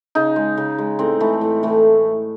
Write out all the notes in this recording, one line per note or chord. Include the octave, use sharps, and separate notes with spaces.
C#3 D#4
G#3
C#3
G#3
A2 C4
E3 A3
A2
E3 A3